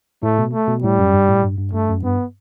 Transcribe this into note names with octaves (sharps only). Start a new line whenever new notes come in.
A2 A3
B2
A3
B2
A2 G3
F#2
G2
A2
G2
G2
G2 A3
F#2
G2 B3